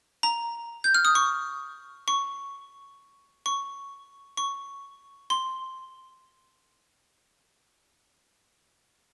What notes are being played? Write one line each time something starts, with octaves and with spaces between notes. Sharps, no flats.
A#5
G6
F6
D#6
C#6
C#6
C#6
C#6
C6